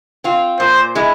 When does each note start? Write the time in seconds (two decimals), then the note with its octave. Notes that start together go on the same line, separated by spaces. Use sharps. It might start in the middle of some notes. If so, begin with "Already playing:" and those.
0.24 C4 F4
0.60 A#2 C5
0.95 G#3 E4